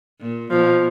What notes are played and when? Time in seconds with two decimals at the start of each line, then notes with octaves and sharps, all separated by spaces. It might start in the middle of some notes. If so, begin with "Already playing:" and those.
0.20 A#2
0.50 B2 F3